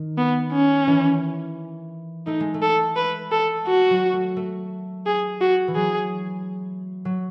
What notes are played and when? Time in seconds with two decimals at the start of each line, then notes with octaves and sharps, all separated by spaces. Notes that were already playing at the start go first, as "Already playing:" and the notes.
Already playing: D#3
0.18 B3
0.52 C#4
0.87 E3
2.27 A3 D#4
2.40 G#3
2.54 A3
2.62 A4
2.96 B4
3.32 A4
3.67 F#4
3.90 F#3
4.13 A3
4.37 A3
5.06 G#4
5.41 F#4
5.68 E3
5.76 F#3 G#4
7.05 F#3